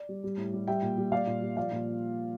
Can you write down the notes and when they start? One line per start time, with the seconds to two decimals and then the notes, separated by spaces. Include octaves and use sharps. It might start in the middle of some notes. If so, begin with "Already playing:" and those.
Already playing: D5
0.09 G3
0.24 G3
0.37 A2
0.53 G3
0.68 G3 E5 G5
0.82 A#2
0.98 G3
1.12 G3 D5 F5
1.27 A#2
1.42 G3
1.57 F3 D5 F5
1.72 A#2